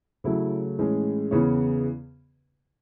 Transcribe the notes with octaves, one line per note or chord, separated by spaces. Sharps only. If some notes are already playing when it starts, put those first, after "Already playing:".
C#3 F#3 A3 E4
A2 E3 G#3 C#4
E2 C#3 E3 B3 C#5